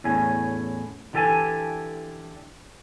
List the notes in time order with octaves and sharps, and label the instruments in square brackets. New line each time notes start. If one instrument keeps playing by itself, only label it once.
[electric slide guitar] E2 A2 C#4 G#5
D3 E3 G4 A4 F#5 G#5